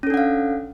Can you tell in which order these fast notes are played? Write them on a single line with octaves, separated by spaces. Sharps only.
C#4 A4 D4 F#5 F5